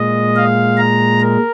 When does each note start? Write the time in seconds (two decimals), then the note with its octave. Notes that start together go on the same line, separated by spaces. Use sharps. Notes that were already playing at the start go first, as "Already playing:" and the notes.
Already playing: A#2 G#3 D#5
0.36 F5
0.78 A#5
1.20 A#4